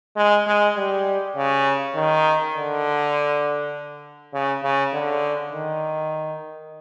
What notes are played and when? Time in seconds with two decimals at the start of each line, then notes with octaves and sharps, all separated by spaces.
0.17 G#3
0.47 G#3
0.77 G3
1.36 C#3
1.95 D#3
2.55 D3
4.33 C#3
4.63 C#3
4.93 D3
5.53 D#3